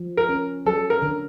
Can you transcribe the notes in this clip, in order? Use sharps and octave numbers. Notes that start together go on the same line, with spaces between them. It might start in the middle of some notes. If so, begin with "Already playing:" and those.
Already playing: F3
A#4
C#4
F#3 A4
A#4
D3